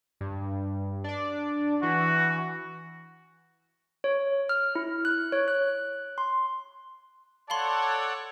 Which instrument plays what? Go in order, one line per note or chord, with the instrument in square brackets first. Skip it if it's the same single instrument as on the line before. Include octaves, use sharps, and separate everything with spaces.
[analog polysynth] G2
D4 D5
[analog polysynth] E3 [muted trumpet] F#4
[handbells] C#5
F6
E4
F#6
C#5
F#6
C6
[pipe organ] A4 D5 F#5 [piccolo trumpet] C#5 [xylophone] F5 B5 C6 [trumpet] A5